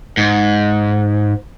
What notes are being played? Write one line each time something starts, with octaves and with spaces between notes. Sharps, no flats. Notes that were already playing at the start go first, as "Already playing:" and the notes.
G#2